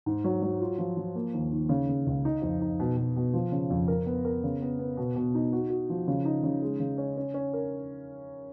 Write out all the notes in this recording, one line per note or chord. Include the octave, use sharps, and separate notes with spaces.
G#2
F#3
F#3
F4
F3
F3
A#3
D#2
D#3
C#3
C#3
C#2
D#4
F2
D#4
B2
B2
B2
F3
C#3
F2
A#4
B3
A#4
C#3
B3
B3
B2
B2
D#4
F#4
F#4
F3
C#3
D#4
C#3
G#3
C#3
C#4
C#4
C#4
A#4